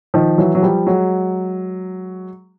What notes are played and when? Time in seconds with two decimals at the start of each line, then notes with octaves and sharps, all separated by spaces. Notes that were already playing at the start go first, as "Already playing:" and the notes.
0.14 D#3 F3
0.38 E3 F#3
0.55 F#3
0.62 F3 G3
0.87 F#3 G#3